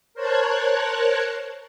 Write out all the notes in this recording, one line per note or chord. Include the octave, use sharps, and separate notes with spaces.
A#4 C5 C#5 A5 F#6 G#6